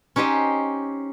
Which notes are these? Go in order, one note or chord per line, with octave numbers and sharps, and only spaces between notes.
C#4 D#4 G4 C5 D#5